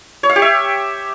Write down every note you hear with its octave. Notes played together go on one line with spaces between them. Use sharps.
C#5
F5
G4
E5